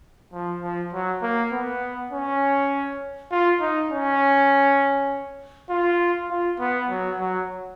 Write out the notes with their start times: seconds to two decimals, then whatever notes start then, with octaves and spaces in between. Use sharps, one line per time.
0.33 F3
0.62 F3
0.93 F#3
1.22 A#3
1.52 B3
2.12 C#4
3.32 F4
3.61 D#4
3.90 C#4
5.70 F4
6.30 F4
6.59 B3
6.90 F#3
7.20 F#3